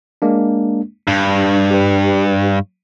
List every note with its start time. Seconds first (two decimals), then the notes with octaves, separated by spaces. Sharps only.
0.22 G#3 A#3 D4
1.07 G2 D4
1.71 G4 B4